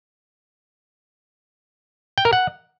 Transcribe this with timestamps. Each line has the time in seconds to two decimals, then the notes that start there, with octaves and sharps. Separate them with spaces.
2.18 G5
2.25 A#4
2.33 F#5